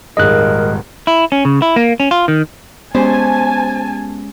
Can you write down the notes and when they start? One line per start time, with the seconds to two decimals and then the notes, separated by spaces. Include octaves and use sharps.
0.17 D#1 G#1 G#3 A#4 D#5 F#6
1.07 E4
1.32 C#4
1.45 C#3
1.62 E4
1.76 A#3
2.00 C#4
2.11 F4
2.28 D#3
2.95 G#3 B3 C#4 G4 C5 G#5 A5